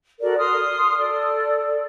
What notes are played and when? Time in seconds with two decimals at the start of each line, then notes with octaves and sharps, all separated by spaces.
0.21 F#4 A4 A#4 D5
0.37 C6 D#6 F6
0.98 A4 D5